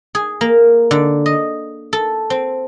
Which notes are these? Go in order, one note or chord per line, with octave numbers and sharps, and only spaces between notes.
G#4
A#3
D3
D#5
A4
C4